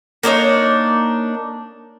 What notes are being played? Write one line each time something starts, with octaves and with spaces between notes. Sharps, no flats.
A#3 D4 D#4 C#5